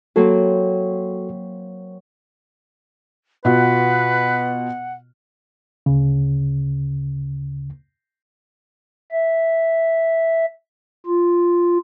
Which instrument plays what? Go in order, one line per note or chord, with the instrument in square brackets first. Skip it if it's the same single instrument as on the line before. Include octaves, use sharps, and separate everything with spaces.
[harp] F#3 A#3 C4 [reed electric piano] F#4 A4
[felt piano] B2 F4 F#4 [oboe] B4 [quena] F#5
[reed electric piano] D2 C#3
[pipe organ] E5
F4